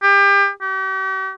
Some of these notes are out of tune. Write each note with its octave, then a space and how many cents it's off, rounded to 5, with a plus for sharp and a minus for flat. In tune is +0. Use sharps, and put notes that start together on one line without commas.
G4 +30
G4 -45